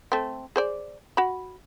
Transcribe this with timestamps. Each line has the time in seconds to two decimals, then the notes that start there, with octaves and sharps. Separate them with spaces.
0.12 A3 C4
0.56 G#4 C5 D5
1.17 F#4 B5